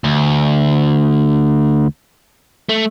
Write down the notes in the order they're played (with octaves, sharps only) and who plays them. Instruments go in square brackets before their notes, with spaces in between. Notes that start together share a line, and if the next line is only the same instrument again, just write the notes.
[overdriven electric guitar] D2
A3